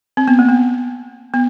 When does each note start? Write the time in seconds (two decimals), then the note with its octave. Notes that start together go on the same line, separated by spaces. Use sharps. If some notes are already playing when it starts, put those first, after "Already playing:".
0.17 C4
0.28 B3
0.39 A#3
0.49 B3
1.34 B3